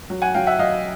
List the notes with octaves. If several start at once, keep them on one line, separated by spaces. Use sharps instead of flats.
F#3
F#5 G#5
F#3 F5 G5
E5 F#5
F#3 D#5 F5